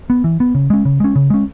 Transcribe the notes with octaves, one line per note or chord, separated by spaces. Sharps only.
B3
E3
B3
C#3
G#3 C#4
C#3
G#3 C#4
C#3
G#3 C#4